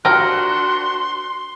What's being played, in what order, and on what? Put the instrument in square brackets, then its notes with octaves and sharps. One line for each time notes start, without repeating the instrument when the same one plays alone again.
[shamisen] F3 G4 [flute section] D4 F#4 F#6 [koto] A#4 [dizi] C6